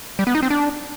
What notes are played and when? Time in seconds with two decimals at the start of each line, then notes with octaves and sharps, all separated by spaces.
0.19 G3
0.27 B3
0.35 D#4
0.43 C4
0.50 D4